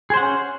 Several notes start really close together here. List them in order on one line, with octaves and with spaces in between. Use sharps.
G#4 C5 F#5 C#4